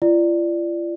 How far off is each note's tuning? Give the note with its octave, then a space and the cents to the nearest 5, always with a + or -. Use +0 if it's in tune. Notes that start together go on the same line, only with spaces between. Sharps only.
F4 -40 D5 +5